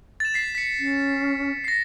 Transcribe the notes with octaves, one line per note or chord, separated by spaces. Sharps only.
A6 E7
B6 C7
B6 C#7
C#4
A#6 C7